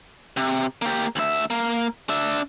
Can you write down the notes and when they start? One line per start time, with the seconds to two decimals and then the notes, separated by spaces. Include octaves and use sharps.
0.37 C3
0.82 A#3 G4
1.16 D2 E5
1.50 A#3
2.09 D4 E5